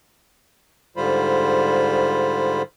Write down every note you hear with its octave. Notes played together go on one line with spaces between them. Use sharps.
G#2 D3 G3 F4 C5 B5